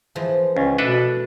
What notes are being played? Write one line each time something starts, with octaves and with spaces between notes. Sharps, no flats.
E3 F3 G#3
C#2 C#4
B2 A3 D4 A4 B4